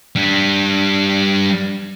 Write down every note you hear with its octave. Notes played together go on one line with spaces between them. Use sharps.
G3 D4